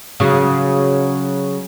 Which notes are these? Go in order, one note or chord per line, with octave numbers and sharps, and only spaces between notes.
C#3 F#3